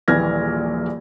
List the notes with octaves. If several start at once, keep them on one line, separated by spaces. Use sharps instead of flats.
D#1 A#1 E3 F6 G#6 A#6